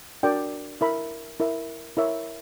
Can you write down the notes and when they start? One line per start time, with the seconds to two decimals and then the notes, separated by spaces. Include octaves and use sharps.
0.23 D4 F#4 A#4 D5 G5
0.81 E4 A#4 E5 B5
1.40 E4 A#4 E5
1.97 E4 A#4 C#5 E5